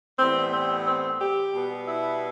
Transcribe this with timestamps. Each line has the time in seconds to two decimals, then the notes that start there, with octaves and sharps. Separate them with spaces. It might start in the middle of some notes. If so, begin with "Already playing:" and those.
0.19 A2 E3 G3 B3 C4
0.52 C4
0.86 C4
1.20 G4
1.53 B2 G3 B3
1.86 E4